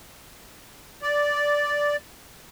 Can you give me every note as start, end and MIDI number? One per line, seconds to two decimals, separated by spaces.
1.02 1.96 74